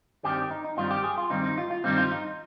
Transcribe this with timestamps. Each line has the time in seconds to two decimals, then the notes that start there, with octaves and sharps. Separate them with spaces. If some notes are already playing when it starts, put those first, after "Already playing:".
0.23 G2 D#3 G3 C4 G4
0.51 D#4
0.64 D#4
0.77 G2 D#3 G3 C4 F4
0.91 G4
1.04 G#4
1.18 F4
1.30 G2 D#3 G3 C4 D#4
1.44 D#4
1.58 F4
1.71 F4
1.84 G2 D#3 G3 C4 D#4
1.98 F4
2.11 D#4